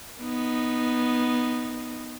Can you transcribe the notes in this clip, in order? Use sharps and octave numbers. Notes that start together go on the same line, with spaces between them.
B3 D#4